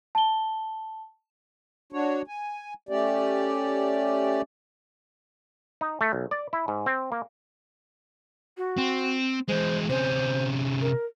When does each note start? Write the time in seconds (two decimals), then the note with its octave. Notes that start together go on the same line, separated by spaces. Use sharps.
0.15 A5 G7
1.92 D4 F#4 C#5
2.27 G#5
2.89 A3 C#4 G4 D5
5.81 D#4
6.01 A3
6.13 B1
6.31 D5
6.53 E4
6.68 G#2
6.86 C4
7.12 A#3
8.57 F#4
8.78 C4
9.48 E3 G#3 C5
9.89 C3 C#4 C5
10.81 A#4